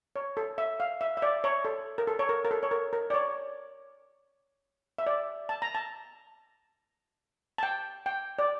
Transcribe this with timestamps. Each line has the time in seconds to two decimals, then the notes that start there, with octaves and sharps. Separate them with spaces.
0.16 C#5
0.37 A4
0.58 E5
0.80 F5
1.01 E5
1.17 E5
1.22 D5
1.44 C#5
1.65 A4
1.98 A#4
2.07 A4
2.19 C#5
2.29 A#4
2.45 A#4
2.51 A4
2.63 C#5
2.71 A#4
2.93 A#4
3.10 D5
3.14 C#5
4.98 E5
5.07 D5
5.49 A5
5.62 A#5
5.75 A5
7.58 A5
7.63 G5
8.06 G5
8.39 D5